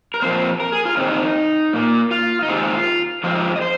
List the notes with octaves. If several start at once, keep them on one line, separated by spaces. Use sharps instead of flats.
A#4
A#2 F3 C4 C5
A#4
G#4
F4
C3 D#3 C4 D#4
A#2 A#3
F4
D#4
C3 D#3 G#3 C4 F4
F2 F3 G#3 C4 F4
D#4
F4
D#5
C5